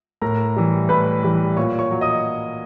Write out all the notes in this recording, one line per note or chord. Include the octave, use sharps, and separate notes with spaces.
A2 A#4 A#5
E3 G3
A2 B4 B5
E3 G3
A#2 C#5 C#6
C#5 C#6
F#3
D#5 D#6